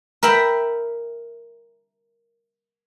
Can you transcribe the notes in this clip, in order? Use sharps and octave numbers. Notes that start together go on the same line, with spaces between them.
A#4 E5 G5 B5